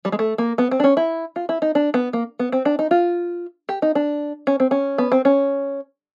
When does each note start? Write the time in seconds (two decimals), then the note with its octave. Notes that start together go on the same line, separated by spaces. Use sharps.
0.05 G3
0.12 G#3
0.19 A3
0.38 A#3
0.58 B3
0.71 C4
0.80 D4
0.84 C#4
0.97 E4
1.36 F4
1.49 E4
1.62 D#4
1.75 D4
1.94 B3
2.13 A#3
2.39 B3
2.52 C4
2.65 D4
2.79 D#4
2.91 F4
3.69 G4
3.82 D#4
3.95 D4
4.47 C#4
4.60 C4
4.71 C#4
4.98 B3
5.12 C4
5.25 C#4